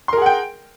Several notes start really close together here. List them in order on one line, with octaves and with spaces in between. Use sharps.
C6 A#4 G#4 F#5 G5